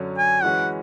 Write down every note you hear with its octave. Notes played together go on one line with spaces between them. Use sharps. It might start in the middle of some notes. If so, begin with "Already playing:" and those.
Already playing: F#2 D3 F#3 C#4
G#5
E3 G#3 C#4 F#4 B4 F#5